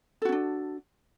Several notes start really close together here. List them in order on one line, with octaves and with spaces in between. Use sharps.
A4 F#4 C#4 D4